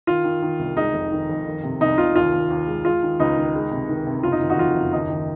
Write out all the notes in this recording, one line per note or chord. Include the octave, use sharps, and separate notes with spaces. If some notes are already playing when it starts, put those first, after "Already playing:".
D#3 F4
D#3
D#3
C2
G#3 D#4
F1
D#3
F2
D#3
C3
C2 D#4
C2 F4
D#2 F4
D#2
D#2
G#3
G#3 F4
D#3
C#2 D#4
D#3
G#3
C3
D#3
C3
F#1 F4
D#4
D#3
D#4 F#4
F2 F4
F#1
D#2 D#4
D#3